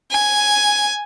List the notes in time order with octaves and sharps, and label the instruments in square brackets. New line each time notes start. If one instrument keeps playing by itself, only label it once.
[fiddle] G#5